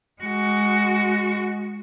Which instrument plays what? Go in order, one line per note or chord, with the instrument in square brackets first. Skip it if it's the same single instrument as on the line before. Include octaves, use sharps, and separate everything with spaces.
[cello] G#3 F#4